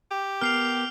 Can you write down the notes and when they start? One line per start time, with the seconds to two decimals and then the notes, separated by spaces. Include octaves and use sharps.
0.11 G4
0.41 B3 A#4 F6 C7 F7